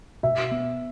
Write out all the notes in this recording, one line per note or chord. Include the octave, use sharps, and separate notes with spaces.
B2 E5
B3